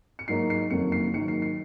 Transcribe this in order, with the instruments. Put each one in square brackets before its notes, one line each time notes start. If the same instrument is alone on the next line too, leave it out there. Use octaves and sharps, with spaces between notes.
[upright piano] C#7
G#2 F#3 A#3 D#4 C7
C7
F#1 F2 D#3 F#3 A#3 C#7
C7
G#2 D#3 F#3 A#3 C#7
C7
C7